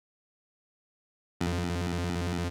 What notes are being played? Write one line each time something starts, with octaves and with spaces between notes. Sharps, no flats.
F2